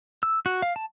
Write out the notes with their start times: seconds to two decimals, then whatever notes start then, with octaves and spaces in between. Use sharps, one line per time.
0.23 E6
0.46 F#4
0.62 F5
0.76 A5